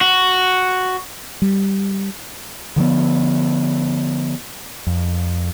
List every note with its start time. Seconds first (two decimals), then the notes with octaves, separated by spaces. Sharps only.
0.01 F#4
1.42 G3
2.76 D3 F3 A#3 B3
4.87 F2